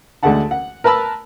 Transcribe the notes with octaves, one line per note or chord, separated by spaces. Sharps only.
D2 D3 G#3 A3 F#5 A5
F#5
A#4 B4 A5 B5 E6